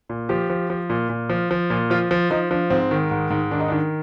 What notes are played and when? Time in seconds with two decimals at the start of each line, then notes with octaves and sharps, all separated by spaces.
0.09 A#2
0.29 F3 G4
0.50 F3
0.70 F3
0.90 A#2
1.09 A#2
1.30 F3
1.51 F3
1.70 A#2
1.90 F3 F4
2.11 F3
2.31 F3 D#4
2.50 F3 D4
2.70 G#2 C4
2.91 D#3
3.11 G#2
3.30 G#2
3.51 D#3 D4
3.60 D#4
3.68 D4
3.72 D#3